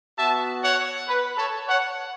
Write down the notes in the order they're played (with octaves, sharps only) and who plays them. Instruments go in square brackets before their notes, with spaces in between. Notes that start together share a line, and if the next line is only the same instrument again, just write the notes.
[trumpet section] B3 F#4 E5 A5
C#5 F#5
B4
A4 C#5
C#5 F#5